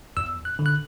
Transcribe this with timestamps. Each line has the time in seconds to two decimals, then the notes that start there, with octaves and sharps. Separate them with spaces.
0.17 E2 E6
0.45 F#6
0.59 D3
0.66 F#6